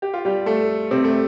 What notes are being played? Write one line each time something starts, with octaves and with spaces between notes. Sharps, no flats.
G4
F4
G3 G4
A3 A4
C3 C4
A3